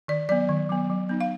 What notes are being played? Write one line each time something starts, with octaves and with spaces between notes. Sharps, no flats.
D#3 D5
F#3 B3 D5
D#3
F#3 B3
F#3
B3 D#4
F5